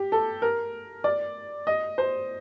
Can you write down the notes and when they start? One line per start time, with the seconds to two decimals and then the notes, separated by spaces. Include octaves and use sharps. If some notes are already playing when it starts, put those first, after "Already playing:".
Already playing: G4
0.12 A4
0.42 A#4
1.04 D5
1.67 D#5
1.98 C5